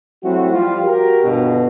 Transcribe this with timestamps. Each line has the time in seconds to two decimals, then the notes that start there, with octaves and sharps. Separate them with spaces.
0.24 F#3 G3 A3 C4 E4 F#4
0.53 F3 G3 F4
0.84 F#4 G4 A#4
1.24 G1 G2 B2